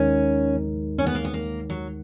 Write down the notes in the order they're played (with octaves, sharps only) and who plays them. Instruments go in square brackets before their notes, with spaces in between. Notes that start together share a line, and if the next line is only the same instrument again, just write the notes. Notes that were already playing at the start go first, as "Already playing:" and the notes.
Already playing: [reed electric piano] D#2 D#3 G#3 D#4 A#4 [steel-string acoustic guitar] C#4
[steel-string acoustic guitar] C#4
B3
A#3
B3
A#3
F#3